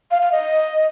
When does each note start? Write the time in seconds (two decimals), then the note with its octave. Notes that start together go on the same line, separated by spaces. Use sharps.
0.11 F5
0.22 F5
0.32 D#5